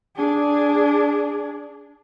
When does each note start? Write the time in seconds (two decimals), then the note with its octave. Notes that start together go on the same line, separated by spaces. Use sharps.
0.16 D4 G#4